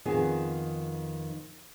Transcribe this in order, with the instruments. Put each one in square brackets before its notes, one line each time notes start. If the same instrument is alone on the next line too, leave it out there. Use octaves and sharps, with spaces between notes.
[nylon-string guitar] F2 D#3 B3 G#4